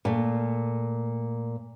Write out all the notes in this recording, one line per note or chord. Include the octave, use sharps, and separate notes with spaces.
A#2 A3